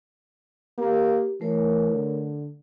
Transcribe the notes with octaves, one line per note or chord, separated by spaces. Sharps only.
A#3 G4
E3 A3 A#4 C#5
D3